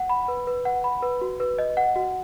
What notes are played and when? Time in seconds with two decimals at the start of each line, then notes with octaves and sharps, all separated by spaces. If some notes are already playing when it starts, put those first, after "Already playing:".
Already playing: F#5
0.10 B5
0.28 B4
0.47 B4
0.65 F#5
0.84 B5
1.03 B4
1.21 F#4
1.40 B4
1.58 D#5
1.77 F#5
1.96 F#4